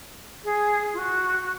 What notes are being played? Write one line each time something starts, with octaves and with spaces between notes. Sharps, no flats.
G#4
F4
F#4
F#4